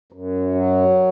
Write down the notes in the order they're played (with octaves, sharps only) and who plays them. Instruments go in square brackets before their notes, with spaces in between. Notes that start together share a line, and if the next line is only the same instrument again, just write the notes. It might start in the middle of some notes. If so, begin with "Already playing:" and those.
[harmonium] F#2
F#3